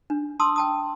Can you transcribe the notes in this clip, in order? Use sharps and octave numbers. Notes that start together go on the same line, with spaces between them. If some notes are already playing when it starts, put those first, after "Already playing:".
D4
A5 C6 D#6 E6
G5 A5 D#6